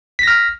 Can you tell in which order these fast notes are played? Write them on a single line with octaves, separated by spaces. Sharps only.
B6 A#6 F6